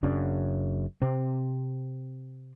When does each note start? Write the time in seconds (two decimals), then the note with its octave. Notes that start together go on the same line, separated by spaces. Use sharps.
0.03 F#1 F#2 C#3 D4
1.02 C3 C4